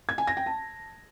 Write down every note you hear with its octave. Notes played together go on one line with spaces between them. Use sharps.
G#6
G#5
A#6
G5
A5